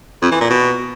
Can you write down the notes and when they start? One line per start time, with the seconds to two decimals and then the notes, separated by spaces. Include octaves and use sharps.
0.22 F2
0.31 E3
0.41 A#2
0.50 B2